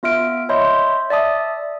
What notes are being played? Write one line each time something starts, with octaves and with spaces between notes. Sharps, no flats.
B3 F4 E5 F6 D7
C#5 D#5 E5 B5 C6 G6
D5 E5 A5 D#6